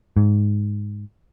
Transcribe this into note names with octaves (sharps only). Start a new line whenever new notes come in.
G#2